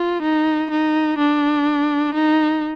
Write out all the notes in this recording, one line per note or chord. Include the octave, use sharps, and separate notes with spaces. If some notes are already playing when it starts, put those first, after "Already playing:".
Already playing: F4
D#4
D#4
D4
D#4